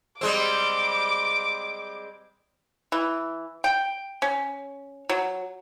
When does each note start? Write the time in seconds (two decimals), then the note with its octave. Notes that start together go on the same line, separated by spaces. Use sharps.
0.21 G3 G#3 C4 D6
2.92 E3
3.64 G5
4.22 C#4
5.09 F#3